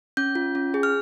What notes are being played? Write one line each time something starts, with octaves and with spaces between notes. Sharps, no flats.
C#4 G6
F4
C#4
G#4
F6